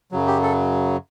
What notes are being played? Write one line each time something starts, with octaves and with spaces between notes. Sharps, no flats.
F#2 C#3 F#3
G4
A4